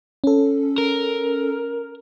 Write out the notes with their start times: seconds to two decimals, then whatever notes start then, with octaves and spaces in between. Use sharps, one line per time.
0.24 C#4 A4
0.78 A#4